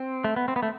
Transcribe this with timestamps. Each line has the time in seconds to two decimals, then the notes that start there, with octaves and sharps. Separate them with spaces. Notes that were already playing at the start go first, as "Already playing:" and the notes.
Already playing: C4
0.24 A3
0.36 B3
0.48 C4
0.56 B3
0.63 A3